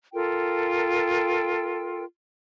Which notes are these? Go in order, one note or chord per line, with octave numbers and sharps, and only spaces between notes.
F4 A4 A#4 G5